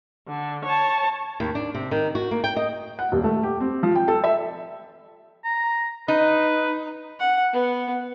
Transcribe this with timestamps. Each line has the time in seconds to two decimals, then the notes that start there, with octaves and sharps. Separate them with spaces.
0.28 D3
0.65 C#5 A5
1.40 D#2
1.55 D4
1.75 C3
1.91 D#3
2.15 F#4
2.31 A#3
2.44 G5
2.56 D#5
2.99 F#5
3.12 D#1
3.24 A3
3.43 G4
3.60 C4
3.83 F3
3.95 G5
4.08 A4
4.24 E5
5.45 A#5
6.08 D#4 B4
7.19 F#5
7.53 B3